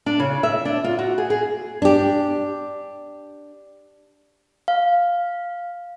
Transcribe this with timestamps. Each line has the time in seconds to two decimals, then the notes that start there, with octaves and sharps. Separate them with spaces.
0.06 D4
0.20 C#3
0.43 E5
0.65 D4
0.84 F4
0.99 F#4
1.18 G#4
1.30 G#4
1.82 D4 G4
4.68 F5